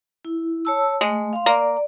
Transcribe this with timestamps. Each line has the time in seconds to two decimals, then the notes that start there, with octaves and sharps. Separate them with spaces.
0.25 E4
0.65 C#5 A5 E6
1.01 G#3 A3
1.33 F5 C6
1.46 A#3 D5